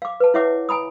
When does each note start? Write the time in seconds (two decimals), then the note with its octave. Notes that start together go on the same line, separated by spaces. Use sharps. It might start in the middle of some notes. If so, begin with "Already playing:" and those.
0.02 F5 D6
0.20 B4 A5
0.34 E4 C#5 E5 F#5 D6
0.69 G#5 A#5 B5 D#6